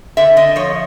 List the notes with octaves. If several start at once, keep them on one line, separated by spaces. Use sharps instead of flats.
D3 E5
D3 D#5
F3 C#5